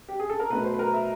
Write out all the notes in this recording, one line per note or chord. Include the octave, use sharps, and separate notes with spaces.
G4
G#4
A4
A#4
B2 F#3 A3 B4
C5
B4
A#4
E5